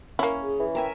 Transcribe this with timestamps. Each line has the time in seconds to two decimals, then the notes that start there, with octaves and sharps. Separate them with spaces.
0.19 A#3 C#4 E4
0.42 G#4
0.59 E3
0.75 A#4 E5 G5 G#5